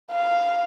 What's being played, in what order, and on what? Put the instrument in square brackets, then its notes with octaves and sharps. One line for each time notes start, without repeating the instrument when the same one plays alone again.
[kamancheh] F5